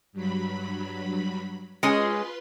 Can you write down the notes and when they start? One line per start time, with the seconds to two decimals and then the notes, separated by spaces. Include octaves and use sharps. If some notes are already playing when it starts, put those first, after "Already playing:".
0.13 G2 F#3 B5
1.83 G#3 C#4 F4 G#4 B4 C6